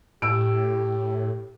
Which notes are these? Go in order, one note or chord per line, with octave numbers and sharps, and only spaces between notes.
A2 G4 E6 D7